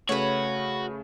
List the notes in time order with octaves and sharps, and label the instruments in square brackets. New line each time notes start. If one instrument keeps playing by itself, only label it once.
[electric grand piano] C#3 A3 [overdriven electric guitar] F#4 [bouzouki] B4 C#5